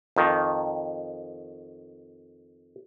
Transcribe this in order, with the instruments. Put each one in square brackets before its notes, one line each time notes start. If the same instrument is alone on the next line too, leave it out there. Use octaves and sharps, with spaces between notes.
[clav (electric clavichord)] F2 D#3